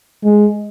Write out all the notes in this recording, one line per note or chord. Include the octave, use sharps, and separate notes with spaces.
G#3